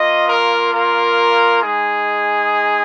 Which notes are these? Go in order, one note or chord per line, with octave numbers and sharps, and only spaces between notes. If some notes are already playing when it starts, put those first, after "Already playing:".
Already playing: A#3 F4 D#5
A#4
A#4
G#3 D#4 G#4